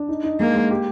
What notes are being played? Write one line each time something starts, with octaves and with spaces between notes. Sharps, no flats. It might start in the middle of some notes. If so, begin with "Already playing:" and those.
Already playing: D4
D#4
D#4
G#3 A#3
G#3
G4